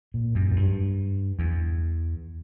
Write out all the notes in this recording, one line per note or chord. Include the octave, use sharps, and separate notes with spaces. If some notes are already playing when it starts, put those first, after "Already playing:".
A#2
F#2
F#2
G2
E2